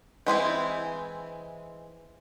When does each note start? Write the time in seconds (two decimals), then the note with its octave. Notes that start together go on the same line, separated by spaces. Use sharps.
0.26 E3 G#3 C4 E4